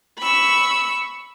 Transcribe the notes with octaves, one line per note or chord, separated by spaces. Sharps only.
B5 C#6 E6